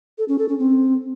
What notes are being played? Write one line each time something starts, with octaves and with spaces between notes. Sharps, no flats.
A4
C#4
A4
C#4
C4